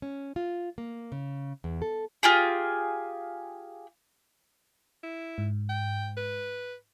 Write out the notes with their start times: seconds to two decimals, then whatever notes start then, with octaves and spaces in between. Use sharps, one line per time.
0.02 C#4
0.36 F4
0.78 A#3
1.12 C#3
1.64 E2
1.82 A4
2.23 F4 G4 G#4
5.03 E4
5.38 G#2
5.69 G5
6.17 B4